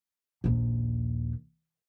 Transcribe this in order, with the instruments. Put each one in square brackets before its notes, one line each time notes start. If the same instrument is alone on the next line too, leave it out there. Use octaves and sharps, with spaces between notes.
[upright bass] A#1 D#2